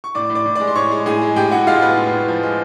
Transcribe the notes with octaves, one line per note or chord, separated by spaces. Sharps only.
C#6
A2 D5 D6
A2
D5 D6
A2
G#3 D5 D6
C6
A2 C#5 C#6
G#3
A2 G#4 G#5
G#3
A2 G4 G5
A2 F#4 F#5
G#3 F4 F5
A2 B3 B4
A2
A2
F3
G#3